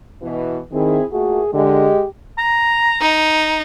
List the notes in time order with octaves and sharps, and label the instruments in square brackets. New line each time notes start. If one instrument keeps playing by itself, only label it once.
[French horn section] B2 E3
[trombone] D#3 [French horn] C4 [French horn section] E4 G#4
[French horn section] A#2 A3 [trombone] F#4 [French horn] G#4
[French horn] D3 [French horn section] G#3 [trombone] G4
[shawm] A#5
[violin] D#4